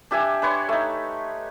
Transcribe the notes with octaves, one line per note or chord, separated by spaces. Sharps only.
D4 G4 E5 G#5
D4 B4 C#5 C6
A3 D#4